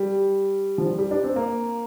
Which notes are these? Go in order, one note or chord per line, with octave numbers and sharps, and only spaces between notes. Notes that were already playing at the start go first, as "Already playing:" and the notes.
Already playing: G3
F3
G3
G3
D4
C4
A#3